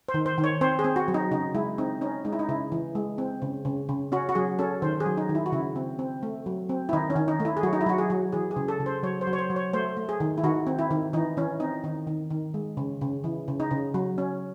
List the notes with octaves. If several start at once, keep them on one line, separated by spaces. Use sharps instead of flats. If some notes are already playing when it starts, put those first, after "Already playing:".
C5
D#3
C5
D#3
C#5
C4 C5
G#4
C4
F#4
F#3
D#4
C#3 D#4
G#3 E4
C4 D#4
C#4 D#4
G#3 D#4
E4
D#4
C#3 E4
E3
G#3
C4
C#3
C#3
C#3
C#4 F#4
F#4
F#3 G#4
C#4 A4
D#3 C5
G#4
F#3
D#4
D#3
E4
F#4
C#3 E4
C4
C4
A3
F#3
C4
E4
D#3 D#4
C#4
D#3
D#4
A3
E4
G#4
F#3 F#4
D#4
E4
F#3 F#4
G#4
F#3
E3 G#4
G#4
C#3
A4
C#3
C5
F#3 C#5
C5
F#3
C#5
C5
F#3
C#5
A3 C5
A3
G#4
D#3
E4
D#3 F#4
C4
E4
D#3
E3 D#4
E3 C#4
C4 D#4
D#3 D#4
D#3
D#3
G#3
C#3
C#3
E3
C#3
D#4
C#3
F#3
C#4